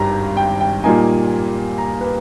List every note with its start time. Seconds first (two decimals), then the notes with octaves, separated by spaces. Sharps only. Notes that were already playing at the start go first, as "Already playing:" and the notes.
Already playing: G#1 G2 G3 A#5
0.37 G5
0.60 G5
0.84 A#2 G3 A#3 D#4 G#5
1.78 A#5
2.01 B4